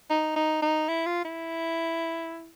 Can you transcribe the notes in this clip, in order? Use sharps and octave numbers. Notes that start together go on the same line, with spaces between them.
D#4
D#4
D#4
E4
F4
E4